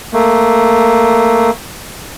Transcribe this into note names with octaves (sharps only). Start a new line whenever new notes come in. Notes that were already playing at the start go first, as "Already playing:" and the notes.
A3 A#3